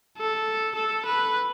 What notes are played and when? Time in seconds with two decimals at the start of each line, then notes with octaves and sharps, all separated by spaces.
0.18 A4
0.75 A4
1.06 B4